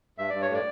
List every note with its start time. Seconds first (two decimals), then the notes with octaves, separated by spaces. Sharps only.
0.18 G2 E5
0.30 G2 D5
0.42 C#5
0.49 A2 D5